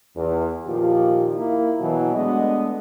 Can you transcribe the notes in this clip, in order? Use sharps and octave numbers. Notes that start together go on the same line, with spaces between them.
E2
A#2 D#3 F3 F4 G4
A#3 E4
B2 E3 F#3
G#3 A3 B3 D4 D#5